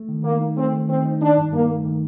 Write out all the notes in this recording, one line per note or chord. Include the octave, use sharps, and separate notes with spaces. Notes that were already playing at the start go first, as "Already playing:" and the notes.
Already playing: A3
D#3
D#3 A#3
D#4
A3 C4
D#3
D#3 C4
D#4
D#3 D4
G2
G2 A#3
A3
D#3